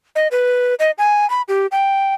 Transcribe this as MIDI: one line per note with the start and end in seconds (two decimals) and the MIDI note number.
0.16 0.28 75
0.31 0.74 71
0.79 0.91 75
0.98 1.28 80
1.30 1.42 83
1.48 1.67 67
1.72 2.14 79